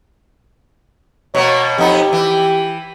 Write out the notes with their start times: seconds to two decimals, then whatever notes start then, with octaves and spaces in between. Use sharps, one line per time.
1.35 B2 A#3 C#5
1.78 F2 B3 D#4 G4
2.13 E3